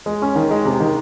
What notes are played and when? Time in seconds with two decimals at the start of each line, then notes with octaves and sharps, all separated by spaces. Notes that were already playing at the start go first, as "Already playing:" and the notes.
0.06 G#3
0.22 C#4
0.35 D#3
0.51 G#3
0.65 C3
0.80 D#3